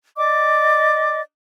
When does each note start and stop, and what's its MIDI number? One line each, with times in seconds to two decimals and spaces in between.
0.17 1.20 74
0.17 1.20 75
0.17 1.20 86